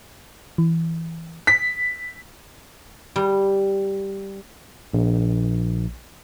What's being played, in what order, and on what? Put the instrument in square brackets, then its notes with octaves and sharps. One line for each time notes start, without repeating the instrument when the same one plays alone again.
[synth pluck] E3
[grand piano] B6
[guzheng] G3
[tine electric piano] A#1